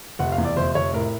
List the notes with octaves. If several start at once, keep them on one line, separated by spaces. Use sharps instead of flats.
F1 F#5
F5
E2
D5
F1 C5
F1 C#5
A2 A#4